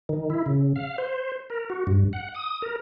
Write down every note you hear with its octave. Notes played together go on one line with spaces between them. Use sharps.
D#3
E4
C#3
F5
C5
A#4
F#4
G2
F#5
D#6
A#4